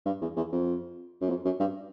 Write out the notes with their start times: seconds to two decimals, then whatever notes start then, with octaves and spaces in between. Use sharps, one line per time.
0.06 G2
0.21 E2
0.36 E2
0.52 F2
1.21 F#2
1.29 F2
1.45 F#2
1.60 G2